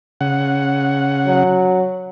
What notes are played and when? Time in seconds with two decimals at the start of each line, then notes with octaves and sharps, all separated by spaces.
0.21 C#3 F#5
1.28 F#3